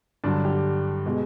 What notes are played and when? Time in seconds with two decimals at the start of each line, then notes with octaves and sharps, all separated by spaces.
0.24 G2 D3 F#3 D4
0.45 G4
1.06 B2 G#3